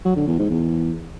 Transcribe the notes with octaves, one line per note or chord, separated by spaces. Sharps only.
F#3
D3
E2
G#2
E2